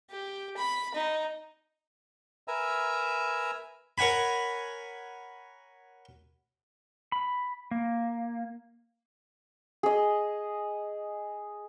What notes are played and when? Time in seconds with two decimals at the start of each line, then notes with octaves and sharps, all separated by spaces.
0.11 G4
0.57 B5
0.94 D#4
2.48 A#4 B4 E5 G#5 A#5
3.98 A#4 C#5 F#5 G#5 B5
7.12 B5
7.71 A#3
9.83 G#4 D#5